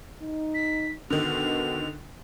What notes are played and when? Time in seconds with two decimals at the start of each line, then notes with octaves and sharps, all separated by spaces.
0.22 D#4
0.55 B6
1.10 B2 D3 D#3 F7